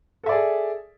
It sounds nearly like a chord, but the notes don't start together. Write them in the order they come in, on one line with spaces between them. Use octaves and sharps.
A4 E5 D5 G#4